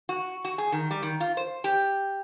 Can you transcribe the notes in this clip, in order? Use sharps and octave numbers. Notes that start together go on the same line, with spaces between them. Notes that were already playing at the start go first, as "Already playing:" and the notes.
F#4
F#4
G#4
D#3
G3
D#3
F4
C5
G4